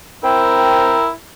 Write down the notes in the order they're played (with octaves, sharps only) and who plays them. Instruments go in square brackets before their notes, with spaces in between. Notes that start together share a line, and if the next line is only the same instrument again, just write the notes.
[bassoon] C4 [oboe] E4 [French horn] A#4 [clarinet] G5